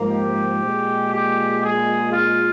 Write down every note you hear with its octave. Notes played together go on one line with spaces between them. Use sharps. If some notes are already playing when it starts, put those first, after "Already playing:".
Already playing: G#2 F3 A#3
G4
A#2 G#3
G4
G#4
F4